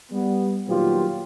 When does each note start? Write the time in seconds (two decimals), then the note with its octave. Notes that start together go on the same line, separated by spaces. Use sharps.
0.11 G3 B3
0.67 A#2 D#3 F#3 B3 F4 G4